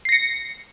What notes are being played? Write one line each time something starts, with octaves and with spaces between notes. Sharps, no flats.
A#6 C7 C#7